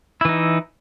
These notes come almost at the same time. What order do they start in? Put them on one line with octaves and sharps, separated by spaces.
E4 E3 D#4